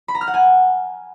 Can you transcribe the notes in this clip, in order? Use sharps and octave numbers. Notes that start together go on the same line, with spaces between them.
B5
A#5
F6
F#5
G#5